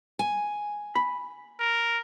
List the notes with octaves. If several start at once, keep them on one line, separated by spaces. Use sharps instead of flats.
G#5
B5
A#4